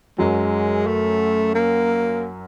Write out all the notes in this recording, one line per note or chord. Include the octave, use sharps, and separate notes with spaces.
F#2 F#3 G#3
A3
A#3